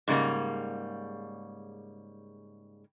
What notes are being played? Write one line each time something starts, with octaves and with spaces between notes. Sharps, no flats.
G#2 C#3 G3 A#3